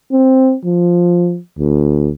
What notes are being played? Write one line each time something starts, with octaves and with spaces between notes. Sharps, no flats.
C4
F3
D2